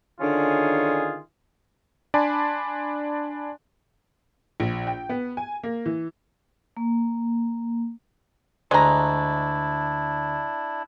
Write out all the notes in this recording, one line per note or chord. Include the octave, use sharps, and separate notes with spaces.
D3 D#3 C#4 F4 G#4
D4 D5 G#5 A5 B5 C6
A#1
G5
B3
G#5
A#3
E3
A#3
D2 G#3 D4 E4 A#5